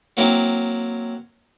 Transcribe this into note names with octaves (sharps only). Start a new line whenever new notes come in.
F#3 A#3 C4 E4